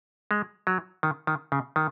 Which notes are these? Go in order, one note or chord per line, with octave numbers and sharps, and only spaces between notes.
G#3
F#3
D#3
D#3
C#3
D#3